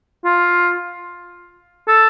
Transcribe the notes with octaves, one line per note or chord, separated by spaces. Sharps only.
F4
A4